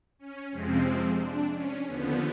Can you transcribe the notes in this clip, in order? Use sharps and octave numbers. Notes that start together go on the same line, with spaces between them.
C#4
F2 C3 F3 G#3 C4
D4
C#4
D#2 D3 F3 B3